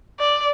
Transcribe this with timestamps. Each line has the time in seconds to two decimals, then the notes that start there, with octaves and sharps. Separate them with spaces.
0.19 D5